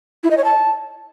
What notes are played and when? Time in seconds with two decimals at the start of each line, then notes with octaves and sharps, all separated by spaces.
0.23 E4
0.30 D#5
0.37 C#5
0.44 A5